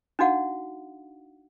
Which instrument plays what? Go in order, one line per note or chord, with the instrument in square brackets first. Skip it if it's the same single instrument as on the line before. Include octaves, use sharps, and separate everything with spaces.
[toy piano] D4 D#4 F#4 F5 F#5